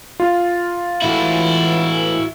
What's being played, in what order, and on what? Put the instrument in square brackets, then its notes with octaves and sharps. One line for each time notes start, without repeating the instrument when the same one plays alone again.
[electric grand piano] F4
[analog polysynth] A2 E3 [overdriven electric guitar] E4 F#4